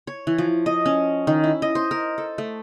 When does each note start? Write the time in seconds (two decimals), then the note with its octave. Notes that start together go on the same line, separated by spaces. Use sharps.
0.07 C#5
0.27 E3
0.38 F3
0.66 D#5
0.86 C#4
1.27 D#3
1.44 E4
1.62 D#5
1.75 C5
1.91 A#4
2.18 A4
2.38 A3